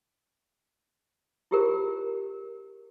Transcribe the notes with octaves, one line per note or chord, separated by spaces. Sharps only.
E4 F4 G4 G#4 A#4 C5